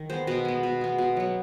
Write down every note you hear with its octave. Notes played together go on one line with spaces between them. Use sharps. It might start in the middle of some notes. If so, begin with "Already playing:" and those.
Already playing: D#3
G#3 B3 C5
B2 B4
G#3 B3
B2
G#3 B3
B2
F#3 B3